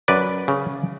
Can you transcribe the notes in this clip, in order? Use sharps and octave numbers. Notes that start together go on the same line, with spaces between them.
F#2 B4 D5
C#3